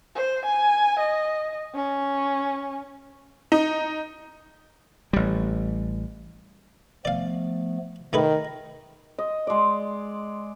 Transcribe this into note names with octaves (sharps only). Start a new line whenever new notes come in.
C5
G#5
D#5
C#4
D#4
A1 G3
F3 A3 B3 D5 F5
D#3 A3 G#4 B4 D#5
D#5
G#3 D5